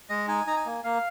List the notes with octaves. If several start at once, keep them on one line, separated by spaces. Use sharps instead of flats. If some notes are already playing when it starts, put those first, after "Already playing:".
G#3 D#5
D#4 G#5
D#4 A#5
G#5
A#3
A#3 F5